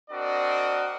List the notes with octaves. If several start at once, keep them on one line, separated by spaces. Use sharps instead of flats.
C4 D4 F#4 A#4 D5 D#5